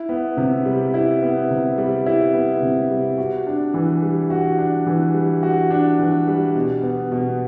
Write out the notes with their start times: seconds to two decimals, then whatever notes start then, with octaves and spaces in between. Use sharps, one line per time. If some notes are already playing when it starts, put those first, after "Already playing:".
Already playing: E4
0.09 B3
0.37 C3
0.65 G3
0.94 E4
1.22 B3
1.50 C3
1.78 G3
2.06 E4
2.34 B3
2.62 C3
2.91 G3
3.18 F#4
3.47 D4
3.74 E3
4.02 G3
4.30 F#4
4.58 D4
4.86 E3
5.14 G3
5.43 F#4
5.70 D4
5.99 E3
6.27 G3
6.55 B2
6.83 B3
7.12 B2